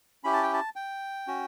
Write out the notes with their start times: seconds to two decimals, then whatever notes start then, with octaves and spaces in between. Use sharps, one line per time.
0.24 C#4 E4 G4 B5
0.33 A5
0.43 G5
0.53 A5
0.76 G5
1.27 C#4 F#4